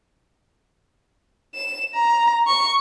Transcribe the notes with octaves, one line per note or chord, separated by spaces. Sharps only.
E7
A#5
C#6